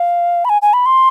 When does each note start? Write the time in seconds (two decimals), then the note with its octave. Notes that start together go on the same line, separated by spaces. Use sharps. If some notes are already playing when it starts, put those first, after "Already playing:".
Already playing: F5
0.45 B5
0.49 G#5
0.62 G#5
0.73 B5
0.86 C6